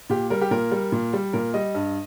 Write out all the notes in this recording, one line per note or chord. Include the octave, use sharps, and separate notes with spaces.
A#2 G4
G3 A#4
G4
A#2 A#4
G3
A#2
G3
A#2 A#4
G3 D#5
G2